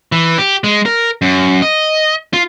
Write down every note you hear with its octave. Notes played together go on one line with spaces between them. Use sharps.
E3
G4
G#3
A#4
F#2
D#5
F4